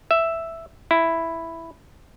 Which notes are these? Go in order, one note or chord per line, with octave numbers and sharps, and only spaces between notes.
E5
E4